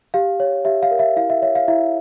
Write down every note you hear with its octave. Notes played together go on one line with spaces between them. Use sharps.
G4 F5
C#5
G4 E5
F5
A#4
E5
E4 F5
E5
C#5 E5
F5
E4 E5